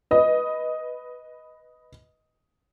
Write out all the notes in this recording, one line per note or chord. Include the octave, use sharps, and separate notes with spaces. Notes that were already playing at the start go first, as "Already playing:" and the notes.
B4 D#5